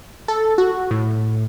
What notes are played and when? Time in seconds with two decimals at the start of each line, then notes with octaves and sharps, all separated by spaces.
0.28 A4
0.58 F#4
0.91 A2